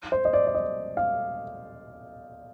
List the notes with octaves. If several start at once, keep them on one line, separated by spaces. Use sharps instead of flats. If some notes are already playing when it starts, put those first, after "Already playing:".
C5
D#5
D5
D5
D#5
F5